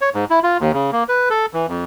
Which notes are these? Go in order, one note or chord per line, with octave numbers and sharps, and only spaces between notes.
C#5
G#2
E4
F4
D#2
C#3
A#3
B4
A4
E3
F2